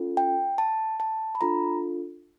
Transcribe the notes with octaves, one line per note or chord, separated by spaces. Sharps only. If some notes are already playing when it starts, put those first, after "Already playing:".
Already playing: C#4 F4 A4
G5
A5
A5
B5
D4 F4 A4 A#5